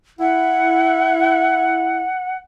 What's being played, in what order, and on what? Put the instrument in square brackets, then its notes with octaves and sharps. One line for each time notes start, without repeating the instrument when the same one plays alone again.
[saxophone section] E4 [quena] F#5